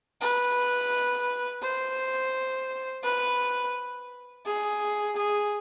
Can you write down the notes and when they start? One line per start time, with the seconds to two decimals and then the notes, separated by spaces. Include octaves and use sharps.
0.21 B4
1.62 C5
3.03 B4
4.46 G#4
5.16 G#4